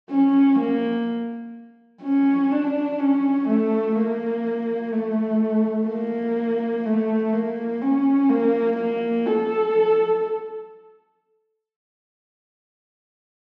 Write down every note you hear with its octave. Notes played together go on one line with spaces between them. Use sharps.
C#4
A#3
C#4
D4
C#4
A3
A#3
A3
A#3
A3
A#3
C#4
A#3
A#3
A4